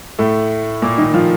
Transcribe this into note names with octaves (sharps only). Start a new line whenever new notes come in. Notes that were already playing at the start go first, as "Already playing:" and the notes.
A2 A3
A#2 A#3
D#3 D#4
F3 F4